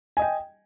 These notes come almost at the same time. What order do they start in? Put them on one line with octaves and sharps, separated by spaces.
G#5 D#5 G5